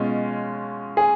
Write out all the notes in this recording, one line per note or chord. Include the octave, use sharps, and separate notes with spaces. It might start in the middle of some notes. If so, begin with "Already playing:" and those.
Already playing: B2 G#3 C#4 F4
G#4